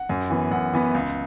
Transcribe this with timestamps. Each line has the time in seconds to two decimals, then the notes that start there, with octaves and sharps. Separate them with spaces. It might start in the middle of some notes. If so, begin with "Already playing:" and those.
Already playing: F#5
0.09 F#2
0.30 E3 B3
0.51 F#2 F#5
0.73 E3 B3
0.94 C#2